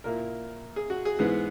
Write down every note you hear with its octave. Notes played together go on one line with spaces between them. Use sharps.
A#2 A#3 E4 A#4
G#4
F#4
G#4
G#2 E3 B3 G#4